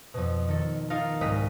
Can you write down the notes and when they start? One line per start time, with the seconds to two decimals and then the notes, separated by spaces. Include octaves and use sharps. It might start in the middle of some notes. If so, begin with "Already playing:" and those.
0.14 F2 B2
0.48 D#3 A4
0.90 D#4 F4 A4 A#4 F5
1.21 C2 G#2 G#3 D#5 G5 B6